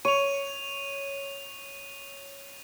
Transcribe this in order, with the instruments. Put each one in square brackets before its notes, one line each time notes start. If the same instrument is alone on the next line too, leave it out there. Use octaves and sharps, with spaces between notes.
[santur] C#5 [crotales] D#7 F7